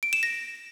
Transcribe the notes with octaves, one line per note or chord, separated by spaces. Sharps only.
D7
E7
A#6